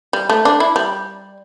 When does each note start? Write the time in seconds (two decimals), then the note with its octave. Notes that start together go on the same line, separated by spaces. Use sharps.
0.13 G3
0.29 A3
0.45 D4
0.60 E4
0.76 G3